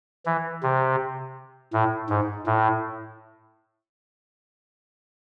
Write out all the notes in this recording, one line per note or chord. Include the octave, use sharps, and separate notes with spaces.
E3
C3
A2
G#2
A2